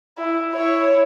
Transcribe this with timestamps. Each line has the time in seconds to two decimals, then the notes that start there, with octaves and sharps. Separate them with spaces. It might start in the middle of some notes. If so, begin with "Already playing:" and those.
0.18 E4
0.53 E4 C#5